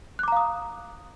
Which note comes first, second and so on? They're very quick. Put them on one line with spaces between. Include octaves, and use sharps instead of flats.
F#6 D6 A#5 F5 D#6